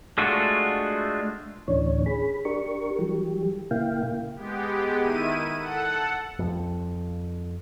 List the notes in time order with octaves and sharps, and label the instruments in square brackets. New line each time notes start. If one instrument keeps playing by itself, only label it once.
[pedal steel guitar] G#3 A3 D4 F4 F#4
[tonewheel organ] D2 A2 E3 C#4 D4 C#5
G#4 B5
D4 G4 A#4 C#6
E3 F#3 G3 G4
A#2 C#3 A#3 E4 F5 G5
[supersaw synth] G#3 B3 G4
D#3 E4 D#7
A4 F#5
[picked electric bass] F2